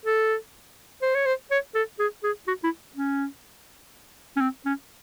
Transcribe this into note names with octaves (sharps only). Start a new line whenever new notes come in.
A4
C5
C#5
C5
C#5
A4
G#4
G#4
F#4
E4
C#4
C#4
C4
C#4